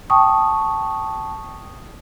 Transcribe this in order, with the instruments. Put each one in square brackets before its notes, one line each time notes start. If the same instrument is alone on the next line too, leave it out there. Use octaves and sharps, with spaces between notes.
[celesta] G5 A5 C#6 D#6